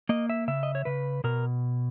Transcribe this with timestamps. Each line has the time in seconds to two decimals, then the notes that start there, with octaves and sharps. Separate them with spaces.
0.09 A#3 D#5
0.30 E5
0.48 C#3 E5
0.63 D#5
0.75 C#5
0.85 C#3 B4
1.24 B2 A#4